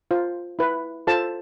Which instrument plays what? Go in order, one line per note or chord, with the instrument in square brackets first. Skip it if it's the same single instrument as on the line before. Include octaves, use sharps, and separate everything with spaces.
[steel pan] F4 C5
E4 B4
F4 A4 C5 A5